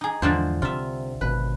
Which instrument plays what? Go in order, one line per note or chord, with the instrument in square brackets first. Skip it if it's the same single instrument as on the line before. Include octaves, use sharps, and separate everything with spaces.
[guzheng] D#4 G#4
[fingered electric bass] E2 G#2 [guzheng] D3 F3 C5
[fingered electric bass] C2 C3 [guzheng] F4 E5
[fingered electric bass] G#1 B2 [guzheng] B4